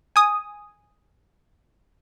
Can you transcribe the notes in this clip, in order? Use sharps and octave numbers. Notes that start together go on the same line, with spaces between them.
G#5 D#6